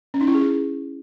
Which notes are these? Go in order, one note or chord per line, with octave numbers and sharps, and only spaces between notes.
C#4
D#4
E4
G#4